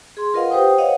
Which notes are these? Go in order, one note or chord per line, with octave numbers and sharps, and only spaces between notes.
G#4 C6
F4 A#4 B4 D#5 F5 F#5
G4 B4 C5 G5 D#6
C#5 D#5 F5 F#5